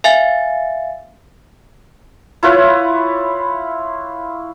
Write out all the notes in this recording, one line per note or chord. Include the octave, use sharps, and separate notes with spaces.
E5 F5 G#5 A6
E4 F4 B4 C#5